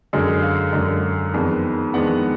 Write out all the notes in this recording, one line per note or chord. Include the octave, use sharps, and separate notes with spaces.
F#2 D3 G#3 D4 G#4
F5
F#2 D3 G#3 D4
F2 D#3 G#3 B3 D4
F2 D#3 G#3 B3 D4 F#5